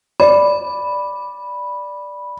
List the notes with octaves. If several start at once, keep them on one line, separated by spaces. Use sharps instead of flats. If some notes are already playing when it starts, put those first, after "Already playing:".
D5 B5